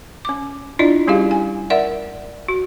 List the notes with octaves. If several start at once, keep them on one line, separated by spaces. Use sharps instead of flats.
C#4 D6
D4 E4 F4 D5 D#5
G3 C#4 E4 G4 G#4 F5
G#5
A#4 D5 E5 F#5
F#4